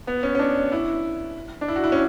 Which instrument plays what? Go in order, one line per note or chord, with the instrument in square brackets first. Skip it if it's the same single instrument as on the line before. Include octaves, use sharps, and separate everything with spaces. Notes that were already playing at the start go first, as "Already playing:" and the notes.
[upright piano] B3
C#4
C#4
D4
E4
D4
E4
F#4
E4
C#4